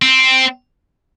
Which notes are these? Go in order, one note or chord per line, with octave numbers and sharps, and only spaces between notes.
C4